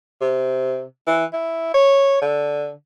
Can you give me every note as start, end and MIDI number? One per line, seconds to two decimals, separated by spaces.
0.21 0.83 48
1.07 1.25 52
1.33 1.71 64
1.74 2.20 73
2.21 2.72 50